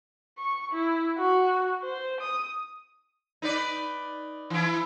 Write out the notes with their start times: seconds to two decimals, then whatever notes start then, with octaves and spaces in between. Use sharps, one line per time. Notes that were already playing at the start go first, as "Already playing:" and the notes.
0.38 C#6
0.72 E4
1.18 F#4
1.83 C5
2.21 D#6
3.42 D#4 B4 D5
4.50 E3 E4